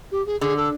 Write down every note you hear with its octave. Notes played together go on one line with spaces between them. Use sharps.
G4
G#4
D3 G#4
A4